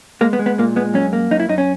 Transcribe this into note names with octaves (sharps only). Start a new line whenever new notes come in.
G#3 A#3
B3
G#3
B3
A#2 A#3
G#3 B3
F#2 C#4
A#3
F#2 D#4
E4
F#2 D#4
C#4